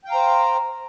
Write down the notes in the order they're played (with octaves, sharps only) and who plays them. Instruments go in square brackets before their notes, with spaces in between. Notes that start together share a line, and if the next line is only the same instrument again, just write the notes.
[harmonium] G5
F5
A#5
C5